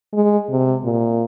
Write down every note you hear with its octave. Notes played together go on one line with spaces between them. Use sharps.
G#3
C3
A#2